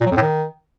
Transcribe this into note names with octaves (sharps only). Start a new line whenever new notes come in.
A#2
F#3
F2
A2
D#3